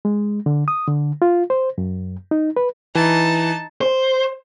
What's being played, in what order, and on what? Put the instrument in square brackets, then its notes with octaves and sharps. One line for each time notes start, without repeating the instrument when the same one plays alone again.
[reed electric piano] G#3
D3
D#6
D3
F4
C5
F#2
D#4
B4
[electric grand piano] E3 [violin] D#4 A5
[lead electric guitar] C5